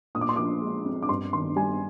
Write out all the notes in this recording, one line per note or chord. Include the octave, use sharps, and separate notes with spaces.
A#2 D#6
D6
C6
F3 D6
G#3
C4
D6
G2 C6
D#3 C6
G3 G#5